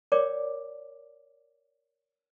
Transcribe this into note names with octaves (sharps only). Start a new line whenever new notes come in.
A#4 C#5 D5 G5 D6